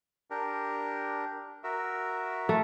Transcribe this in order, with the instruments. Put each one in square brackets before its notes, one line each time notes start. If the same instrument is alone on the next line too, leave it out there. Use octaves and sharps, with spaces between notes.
[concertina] D4 G4 A#4
F#4 A#4 E5
[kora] A3